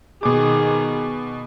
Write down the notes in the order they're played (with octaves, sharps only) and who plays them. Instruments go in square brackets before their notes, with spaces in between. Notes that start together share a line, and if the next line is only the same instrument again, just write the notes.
[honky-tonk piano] B2 D6 [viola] D#3 G#4